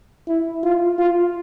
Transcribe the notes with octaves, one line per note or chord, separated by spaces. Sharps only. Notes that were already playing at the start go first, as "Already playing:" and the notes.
E4
F4
F4